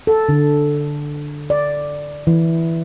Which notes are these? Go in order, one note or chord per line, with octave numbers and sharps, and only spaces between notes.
A4
D3
D5
E3